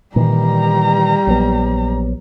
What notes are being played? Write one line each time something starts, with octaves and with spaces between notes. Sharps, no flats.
A#2 D#3 E3 G3 A#5
A#1 F#3 B3